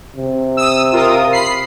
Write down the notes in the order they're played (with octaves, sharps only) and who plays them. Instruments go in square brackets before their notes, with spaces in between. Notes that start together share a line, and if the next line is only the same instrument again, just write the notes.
[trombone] C3
[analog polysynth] D#6 E6
F4 A#4 D#6
B5 C7